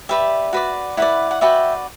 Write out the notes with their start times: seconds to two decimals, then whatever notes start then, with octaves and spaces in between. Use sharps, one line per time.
0.09 G4 B4 D5 E5
0.53 F#4 B4 D5
0.97 E4 B4 D5 F#5
1.31 F#5
1.41 F#4 B4 D5 E5 G5